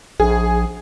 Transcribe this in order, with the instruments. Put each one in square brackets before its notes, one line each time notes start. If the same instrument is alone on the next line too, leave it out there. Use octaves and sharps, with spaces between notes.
[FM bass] A#1 [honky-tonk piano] G#4